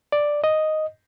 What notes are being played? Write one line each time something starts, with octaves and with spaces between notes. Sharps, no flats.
D5
D#5